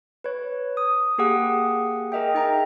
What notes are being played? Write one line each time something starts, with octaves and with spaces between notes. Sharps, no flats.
B4 C#5
D#6
A#3 G4 G#4 F#5 D#6
G#4 A#4 D#5 E5 G5
D#4 G5 A#5